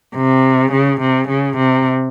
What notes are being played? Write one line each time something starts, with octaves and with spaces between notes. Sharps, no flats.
C3
C#3
C3
C#3
C3